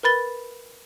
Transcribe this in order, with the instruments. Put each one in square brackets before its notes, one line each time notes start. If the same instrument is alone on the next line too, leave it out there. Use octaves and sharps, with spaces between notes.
[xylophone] A#4 B4 B5 A6 G7